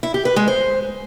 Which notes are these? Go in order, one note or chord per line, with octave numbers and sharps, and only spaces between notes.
E4
G4
B4
G#3
C5